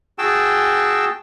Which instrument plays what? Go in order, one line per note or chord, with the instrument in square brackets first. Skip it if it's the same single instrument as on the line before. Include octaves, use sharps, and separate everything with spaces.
[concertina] F#4 G#4 G5 A5 E6